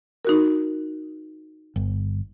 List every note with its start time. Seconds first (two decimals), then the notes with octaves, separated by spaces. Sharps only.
0.25 D#4 F#4 A#4
1.76 G1